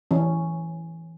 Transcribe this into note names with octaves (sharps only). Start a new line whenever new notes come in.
E3 C#4